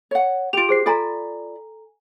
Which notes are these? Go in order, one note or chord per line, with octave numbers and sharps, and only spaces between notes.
C#5 F#5
F4 G4 D7 F7
G#4 C5 C7
F4 A4 D5 G#5 A#5 B5